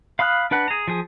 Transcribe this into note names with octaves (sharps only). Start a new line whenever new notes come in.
F5 B5 D#6 F6 F#6
D4 B4 F#5
G#4 A#5
F3 G#4